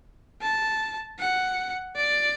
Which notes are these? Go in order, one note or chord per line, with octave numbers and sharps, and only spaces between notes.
A5
F#5
D5